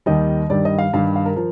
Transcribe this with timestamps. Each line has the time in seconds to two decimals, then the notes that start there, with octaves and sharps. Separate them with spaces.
0.06 D#2 D#3 G3 D#5
0.50 G2 D#3 G3 D5
0.65 D#5
0.78 F5
0.93 G2 D#3 G3 F5
1.16 F5
1.26 A#4
1.36 F3 A#4